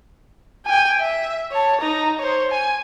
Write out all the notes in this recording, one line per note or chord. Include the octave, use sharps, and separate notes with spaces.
G5 G#5
E5
C#5 A5
D#4 A#5
C5 C#5
G#5